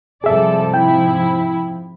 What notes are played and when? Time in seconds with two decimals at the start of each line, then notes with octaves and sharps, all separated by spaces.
0.24 G#2 C3 F3 G3 G#4 A4 D5 E5
0.74 E4 G5